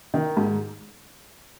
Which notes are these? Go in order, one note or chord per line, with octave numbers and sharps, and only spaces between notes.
D#3
G#2